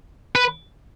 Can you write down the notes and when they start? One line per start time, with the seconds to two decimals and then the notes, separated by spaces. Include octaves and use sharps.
0.35 B4